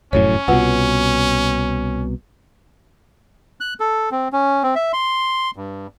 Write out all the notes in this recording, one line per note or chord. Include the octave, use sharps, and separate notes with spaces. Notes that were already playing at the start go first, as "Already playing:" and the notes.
F1 F#2 A2 C#4 C#5
C2 B2 F4 B4 F#5
F#6
A4
C4
C#4
C4
E5
C6
G2